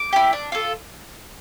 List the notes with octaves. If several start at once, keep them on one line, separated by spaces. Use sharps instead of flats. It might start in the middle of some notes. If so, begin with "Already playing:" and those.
Already playing: D6
E4 G4
D4
F4 A4